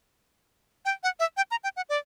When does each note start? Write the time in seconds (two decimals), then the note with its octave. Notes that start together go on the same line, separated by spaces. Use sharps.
0.85 G5
1.03 F#5
1.20 E5
1.37 G5
1.51 A#5
1.64 G5
1.76 F#5
1.89 D5